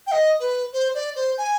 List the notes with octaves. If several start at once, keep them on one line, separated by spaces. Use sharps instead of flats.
G5
D#5
B4
C5
D5
C5
G#5